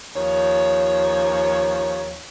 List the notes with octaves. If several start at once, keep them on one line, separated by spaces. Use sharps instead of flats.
D#2 F3 C#5